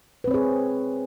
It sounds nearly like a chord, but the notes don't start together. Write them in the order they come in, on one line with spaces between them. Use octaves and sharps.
B4 C4 C#5 G#4